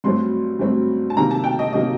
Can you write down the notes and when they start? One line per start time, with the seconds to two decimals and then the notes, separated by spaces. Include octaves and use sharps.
0.04 G2 F#3 A3 C4 C6
0.59 G2 F#3 A3 C4
1.10 A5
1.17 C3 D#3 F#3 A#3 A#5
1.31 A5
1.44 G5
1.59 D#5
1.72 C3 D#3 F#3 A#3 D#5